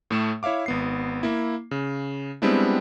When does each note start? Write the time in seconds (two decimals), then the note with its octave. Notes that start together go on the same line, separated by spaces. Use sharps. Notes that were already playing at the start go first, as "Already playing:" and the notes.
0.11 A2 A3 E7
0.43 E4 C#5 E5 F5 D6
0.66 G#1 B3 C7
1.23 A#3 E4
1.71 C#3
2.42 G3 G#3 B3 C4 D4 E4